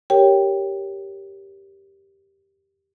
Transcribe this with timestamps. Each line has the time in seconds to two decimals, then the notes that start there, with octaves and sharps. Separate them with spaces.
0.10 G4 A#4 C#5 G5